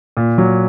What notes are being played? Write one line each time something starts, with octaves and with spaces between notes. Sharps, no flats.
A#2
F#3